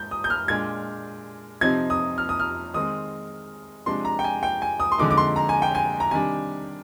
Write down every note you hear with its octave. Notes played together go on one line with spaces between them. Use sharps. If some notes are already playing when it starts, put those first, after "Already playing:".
Already playing: G#2 G6
D#6
G6
F6
A#2 G#3 D4 G#6
C3 F3 C4 D#4 G#6
D#6
F6
D#6
F6
D#3 G#3 C4 D#6
C3 F3 G#3 D4 C6
A#5
G5
G#5
G5
G#5
D#6
C6
F2 D3 G#3 D#4 D6
D6
C6
A#5
G#5
G5
G#5
A#5
C3 D#3 G3 D4 G#5